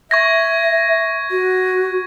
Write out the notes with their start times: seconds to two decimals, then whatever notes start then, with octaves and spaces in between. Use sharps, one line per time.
0.11 E5 C#6 G#6 A#6
1.31 F#4